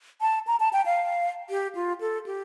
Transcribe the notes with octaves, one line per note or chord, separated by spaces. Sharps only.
A5
A#5
A5
G5
F5
G4
F4
A4
G4